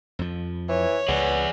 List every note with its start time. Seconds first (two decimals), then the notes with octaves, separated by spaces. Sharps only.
0.19 F2 F3
0.69 E3 C#5
1.08 C#2 B3 G#4 D5